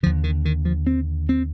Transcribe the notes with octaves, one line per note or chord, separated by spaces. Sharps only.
D#2 D3 F3
D#3
D#3
F3
C4
C4